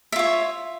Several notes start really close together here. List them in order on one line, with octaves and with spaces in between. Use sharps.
E5 F4 C#5